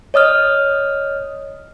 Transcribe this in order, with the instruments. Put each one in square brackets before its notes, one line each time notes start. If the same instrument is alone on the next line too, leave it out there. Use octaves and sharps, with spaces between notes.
[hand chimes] C#5 D#5 D#6 F6